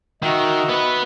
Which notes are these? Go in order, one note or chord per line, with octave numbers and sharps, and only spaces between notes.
D#3 F#4 D#5 E5
B3 B4